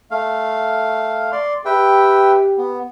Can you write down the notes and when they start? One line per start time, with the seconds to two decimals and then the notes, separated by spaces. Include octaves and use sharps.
0.11 A3 F5
1.32 D5 C6
1.65 G4 B4 E5 G5
2.58 B3